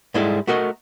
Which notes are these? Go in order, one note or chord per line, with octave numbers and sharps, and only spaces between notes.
G#2 G3 G#3 E4 A4
A3 F#4 A#4 D#5